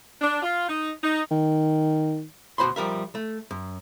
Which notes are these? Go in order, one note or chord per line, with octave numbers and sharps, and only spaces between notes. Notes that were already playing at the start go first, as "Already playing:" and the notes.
D4
F4
D#4
D#4
D#3
D2 B2 F#4 C5 B5 C6
F3 G3 A#4 E5
A3
F#2